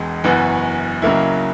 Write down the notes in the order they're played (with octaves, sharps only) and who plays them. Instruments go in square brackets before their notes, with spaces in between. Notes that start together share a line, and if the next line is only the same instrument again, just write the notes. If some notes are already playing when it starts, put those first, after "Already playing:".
Already playing: [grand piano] E1 E2 G#3
F#1 F#2 E3 B3 F#4
C#2 C#3 F#3 A#3 E4